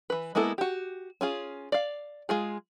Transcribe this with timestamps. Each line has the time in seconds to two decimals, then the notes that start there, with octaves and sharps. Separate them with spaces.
0.10 E3 B4
0.35 G#3 A#3 B3 E4 A4
0.58 F#4 G4
1.21 C#4 F4 G#4
1.72 D5 F5
2.29 G#3 F4 G#4